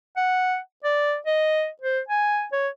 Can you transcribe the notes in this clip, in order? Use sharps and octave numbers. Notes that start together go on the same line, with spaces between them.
F#5
D5
D#5
C5
G#5
C#5